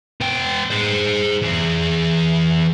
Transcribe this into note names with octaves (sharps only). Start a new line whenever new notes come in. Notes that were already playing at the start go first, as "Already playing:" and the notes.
B3 G5
G#4 C5
E3 G#4